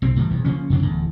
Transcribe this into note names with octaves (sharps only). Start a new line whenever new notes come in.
B1 C4
A2 D#3 E3 G3
E1 E2
C#3 F3 A#3 C#4
F2 C#3 D4
D1 E2 A2